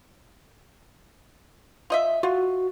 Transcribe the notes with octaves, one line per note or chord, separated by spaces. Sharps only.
F4 D#5 E5
F4 F#4